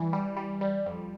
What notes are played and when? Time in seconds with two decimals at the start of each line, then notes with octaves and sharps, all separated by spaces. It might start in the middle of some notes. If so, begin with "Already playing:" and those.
Already playing: E3 G3
0.13 G3
0.37 G3
0.61 G3
0.86 F2